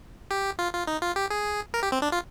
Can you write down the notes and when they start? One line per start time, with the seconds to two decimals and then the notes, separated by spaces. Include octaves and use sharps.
0.31 G4
0.59 F4
0.74 F4
0.87 D#4
1.02 F4
1.16 G4
1.30 G#4
1.74 A#4
1.83 G4
1.92 C4
2.02 D4
2.12 F4